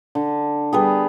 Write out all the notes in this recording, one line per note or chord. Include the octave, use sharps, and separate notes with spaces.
D3
G3 B3 G#4